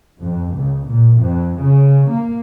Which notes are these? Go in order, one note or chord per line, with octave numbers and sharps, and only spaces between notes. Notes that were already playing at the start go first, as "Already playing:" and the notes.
F2
C#2
A#2
F2
C#3
A#3